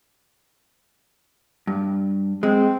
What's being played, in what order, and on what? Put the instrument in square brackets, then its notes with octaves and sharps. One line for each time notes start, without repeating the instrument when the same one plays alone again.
[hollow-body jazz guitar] G2
[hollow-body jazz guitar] G#3 [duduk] C4